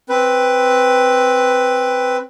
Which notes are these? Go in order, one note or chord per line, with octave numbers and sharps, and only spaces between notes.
C4 B4